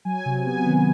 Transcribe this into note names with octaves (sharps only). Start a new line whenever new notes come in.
F#3 G#5
C3
B3 G#5
D#3